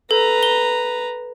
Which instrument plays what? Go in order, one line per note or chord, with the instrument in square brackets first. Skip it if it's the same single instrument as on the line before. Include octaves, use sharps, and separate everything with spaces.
[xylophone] A4 [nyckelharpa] B4 A#5
[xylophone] G7